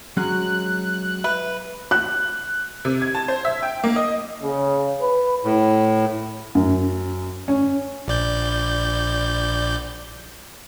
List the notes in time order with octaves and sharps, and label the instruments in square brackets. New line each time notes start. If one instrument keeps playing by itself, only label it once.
[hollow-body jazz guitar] F#3 G#3 C#4 [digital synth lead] F#6
[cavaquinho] B4 [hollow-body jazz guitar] E5
[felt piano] F#6
[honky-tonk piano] C3
G#6
A5
C5
E5
G5
A#3
D#5
[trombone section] C#3
B4
[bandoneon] A2
[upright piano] F#2
C#4
[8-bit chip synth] A#1 D5 G6